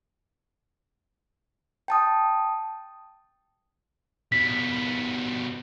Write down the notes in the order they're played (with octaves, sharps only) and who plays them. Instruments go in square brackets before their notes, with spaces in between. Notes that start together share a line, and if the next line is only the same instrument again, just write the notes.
[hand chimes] G5 A5 D#6
[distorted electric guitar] B2 G3 [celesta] B6